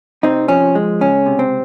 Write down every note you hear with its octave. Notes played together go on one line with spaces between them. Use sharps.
C3 C4 D#4
F3 C#4
G#3
C#2 C#4
C3
C4